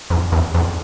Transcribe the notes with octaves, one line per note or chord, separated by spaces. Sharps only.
F2
E2
F2